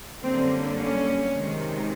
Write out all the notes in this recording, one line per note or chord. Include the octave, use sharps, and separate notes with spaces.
F#2 D3 G3 A#3 C4
C#4
C3 D#3 G#3